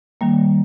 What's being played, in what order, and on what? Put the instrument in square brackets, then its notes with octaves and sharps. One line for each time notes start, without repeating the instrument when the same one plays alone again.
[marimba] D#3 G3 A#3